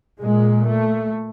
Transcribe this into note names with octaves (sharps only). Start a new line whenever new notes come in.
A#2 G#3
A3